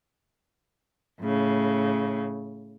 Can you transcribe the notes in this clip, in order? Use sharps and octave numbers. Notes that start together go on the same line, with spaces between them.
A2 C#3